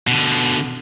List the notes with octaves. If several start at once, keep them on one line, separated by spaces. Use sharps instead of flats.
B2 D3